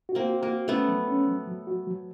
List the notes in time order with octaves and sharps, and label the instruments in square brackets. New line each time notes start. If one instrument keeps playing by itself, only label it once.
[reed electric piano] F#4
[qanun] A#3 C4
[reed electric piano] F#4
[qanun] A#3
[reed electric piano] F#4
[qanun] A3 B3 [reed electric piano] C#4
[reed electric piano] F#3
C#4
F#3
F#3
F#4
F#3